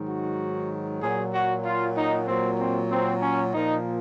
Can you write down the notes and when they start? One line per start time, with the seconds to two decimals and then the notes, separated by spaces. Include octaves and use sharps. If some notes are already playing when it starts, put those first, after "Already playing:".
Already playing: G#2 D#3 F#3
0.08 F#4
1.02 A#2 F#3 G#4
1.34 F#4
1.65 F4
1.97 D#4
2.28 A#2 F#3 C4
2.60 C4
2.91 C4
3.22 C#4
3.54 A#2 F3 D#4